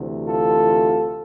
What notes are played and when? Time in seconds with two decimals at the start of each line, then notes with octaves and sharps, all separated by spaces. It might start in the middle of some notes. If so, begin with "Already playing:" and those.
Already playing: D2 C3 E3
0.26 F4 A4